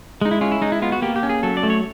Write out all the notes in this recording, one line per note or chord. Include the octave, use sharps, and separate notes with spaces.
G#3 D#4
E4
C#4 F4
E4
G#3 D#4
E4
B3 F4
F#4
A#3 G4
G4
C#4
G#4
F#3 A4
D5
A3
C#5